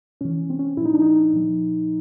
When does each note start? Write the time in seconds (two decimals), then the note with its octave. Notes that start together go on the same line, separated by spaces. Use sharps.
0.21 C3 E3 C#4
0.50 C4
0.59 C#4
0.77 A#2 F3 E4
0.85 D#4
0.94 D4
1.02 D#4
1.33 A#2 F3